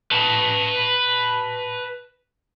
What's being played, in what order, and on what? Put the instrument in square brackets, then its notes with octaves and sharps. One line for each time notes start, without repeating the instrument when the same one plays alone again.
[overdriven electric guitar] B4 A5